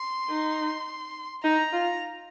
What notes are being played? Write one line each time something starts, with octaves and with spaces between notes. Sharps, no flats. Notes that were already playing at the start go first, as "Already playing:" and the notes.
Already playing: C6
D#4
D#4 A#5
F4